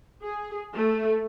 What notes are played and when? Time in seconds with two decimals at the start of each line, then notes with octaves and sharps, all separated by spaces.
0.22 G#4
0.74 A3